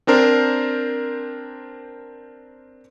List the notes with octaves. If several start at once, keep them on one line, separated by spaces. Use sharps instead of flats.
C4 D4 A#4 C5